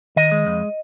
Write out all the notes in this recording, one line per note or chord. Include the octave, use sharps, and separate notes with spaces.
D#3 D#5
G#3
F2